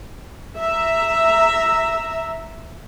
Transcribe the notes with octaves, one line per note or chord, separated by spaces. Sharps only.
E5 A#5